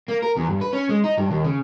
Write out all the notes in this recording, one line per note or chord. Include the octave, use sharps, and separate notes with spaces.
A#3
A#4
E2
G2
B4
C#4
G#3
D#4
G2
D#2
C#3